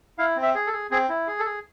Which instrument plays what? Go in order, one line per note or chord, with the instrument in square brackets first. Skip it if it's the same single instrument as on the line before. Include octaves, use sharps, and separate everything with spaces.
[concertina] E4 F5
C4
E5
G#4
A4
G#4
C4 G#4
E4
G#4
A4
G#4